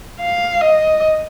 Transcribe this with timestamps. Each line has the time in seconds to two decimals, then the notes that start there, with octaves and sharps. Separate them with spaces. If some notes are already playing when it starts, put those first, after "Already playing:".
0.20 F5
0.61 D#5